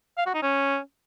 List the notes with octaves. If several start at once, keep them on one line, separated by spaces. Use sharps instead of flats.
F5
F#4
D#4
C#4